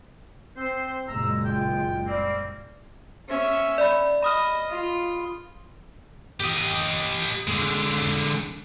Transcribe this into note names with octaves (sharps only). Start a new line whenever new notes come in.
C4 C5
F#1 A#2 G#3 A#5 E6
F4 G5
G3 A#3 C4
C#4 E5
D5 B5
D#5 B5 D#6 F6
F4
G4 D#5
D3 G#3